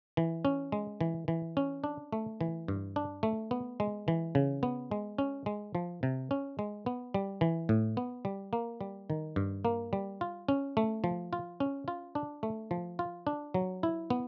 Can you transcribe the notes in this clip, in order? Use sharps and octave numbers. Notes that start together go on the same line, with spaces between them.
E3
C#4
G#3
E3
E3
C#4
D4
A3
E3
G2
D4
A3
B3
G#3
E3
C#3
B3
G#3
C#4
G#3
F3
C3
C#4
G#3
B3
G3
E3
A2
B3
G3
A#3
G3
D#3
G2
A#3
G3
F4
C#4
A3
F3
F4
C#4
F4
D4
A3
F3
F4
D4
F#3
E4
B3